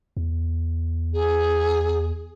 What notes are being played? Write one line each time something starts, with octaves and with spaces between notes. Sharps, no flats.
E2
G#4